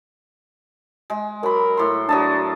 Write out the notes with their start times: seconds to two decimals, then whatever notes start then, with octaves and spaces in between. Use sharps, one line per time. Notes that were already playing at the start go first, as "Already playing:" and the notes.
1.10 G#3
1.43 F#3 A#4 B5
1.77 A2 C6
2.09 F#3 D4 D#5 A5